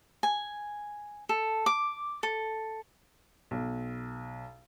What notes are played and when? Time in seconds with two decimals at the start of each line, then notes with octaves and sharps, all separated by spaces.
0.23 G#5
1.29 A4
1.66 D6
2.23 A4
3.51 B1